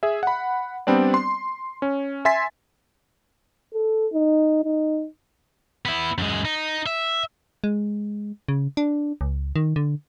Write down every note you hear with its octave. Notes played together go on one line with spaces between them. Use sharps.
G#4 E5
F#5 B5
G3 B3 C4 D4 D5
C6
C#4
E5 G#5 C6 A6 B6
A4
D#4
D#4
B3 E4
F#2 G#3
D#4
E5
G#3
C#3
D4
C#2
D#3
D3